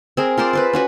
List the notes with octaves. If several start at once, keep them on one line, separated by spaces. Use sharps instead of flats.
C4 G#4 A#4
F4 A#4 C5 D5
B4 C5 D5
C#4 F#4 B4